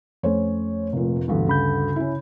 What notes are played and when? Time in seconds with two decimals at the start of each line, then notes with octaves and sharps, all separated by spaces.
0.23 F2 A3 C#4 C5 C#5
0.93 F1 A#2
1.28 D2 G2 B2 D3 E3
1.48 C#3 B5 G6
1.96 C#4 E4